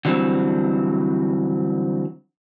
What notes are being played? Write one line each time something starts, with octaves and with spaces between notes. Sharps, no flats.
D3 E3 F#3 G3 C4